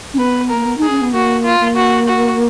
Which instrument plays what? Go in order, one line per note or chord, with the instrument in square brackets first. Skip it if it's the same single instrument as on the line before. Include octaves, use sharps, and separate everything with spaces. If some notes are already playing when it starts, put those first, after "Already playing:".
[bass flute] C#4
[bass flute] B3 [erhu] B4
[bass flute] A#3 [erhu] A#4
[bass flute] B3
[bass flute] D#4 [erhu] G#4
[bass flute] C#4
B3
[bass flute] A#3 [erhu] F#4
[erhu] F4
[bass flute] A#3
[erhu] F#4
F#4